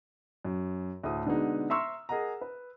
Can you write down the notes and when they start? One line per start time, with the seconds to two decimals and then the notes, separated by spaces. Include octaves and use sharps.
0.45 F#2
1.03 D2 A2 A3 D#6
1.25 B2 D3 G#3 B3 D#4
1.70 E5 A#5 C6 C#6 E6 F6
2.09 G#4 A#4 D#5 F#5 A#5
2.41 B4